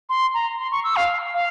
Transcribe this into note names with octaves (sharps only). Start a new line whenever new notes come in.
C6
A#5
C6
C#6
E6
F5
F5